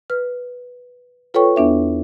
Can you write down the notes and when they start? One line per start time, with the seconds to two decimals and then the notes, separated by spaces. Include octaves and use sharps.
0.10 B4 F6
1.34 F4 A4 B4 C#5 G5 C#6
1.56 E2 B3 D4 E5